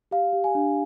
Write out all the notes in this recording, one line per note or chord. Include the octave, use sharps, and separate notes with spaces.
G4 F5
G4
G#5
D4